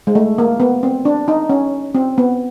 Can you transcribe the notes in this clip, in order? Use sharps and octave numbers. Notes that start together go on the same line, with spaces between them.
G#3
A3
A#3
B3
C4
D4
D#4
C#4
C4
B3